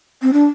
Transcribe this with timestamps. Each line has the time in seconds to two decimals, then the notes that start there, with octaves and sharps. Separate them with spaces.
0.22 C4
0.33 D4